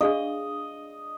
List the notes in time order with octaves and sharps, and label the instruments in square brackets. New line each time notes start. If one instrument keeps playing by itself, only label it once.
[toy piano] D4 G#4 F5 [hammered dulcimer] D#5